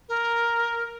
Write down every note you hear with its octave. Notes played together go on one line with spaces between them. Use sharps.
A#4